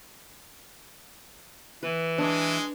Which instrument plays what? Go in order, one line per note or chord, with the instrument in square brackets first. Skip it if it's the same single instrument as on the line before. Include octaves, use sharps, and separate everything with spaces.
[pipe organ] E3 [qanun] B4
[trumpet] G#3 [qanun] D4